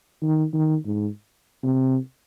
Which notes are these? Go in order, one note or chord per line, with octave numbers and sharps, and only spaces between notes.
D#3
D#3
G#2
C3